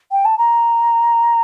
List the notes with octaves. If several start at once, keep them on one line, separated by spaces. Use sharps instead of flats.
G5
A5
A#5